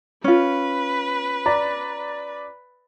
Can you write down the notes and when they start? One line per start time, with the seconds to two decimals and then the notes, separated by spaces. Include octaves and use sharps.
0.24 C#4 F4 B4
1.46 D5 A#5